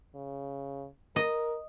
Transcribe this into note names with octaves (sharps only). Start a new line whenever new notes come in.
C#3
A#4 D#5